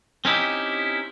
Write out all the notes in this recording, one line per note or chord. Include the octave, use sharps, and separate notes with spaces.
C4 C#4 D#4 E4 G4